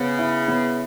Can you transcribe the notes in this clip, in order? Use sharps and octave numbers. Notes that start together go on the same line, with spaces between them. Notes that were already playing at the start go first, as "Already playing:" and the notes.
Already playing: C#3 B3
E4
B3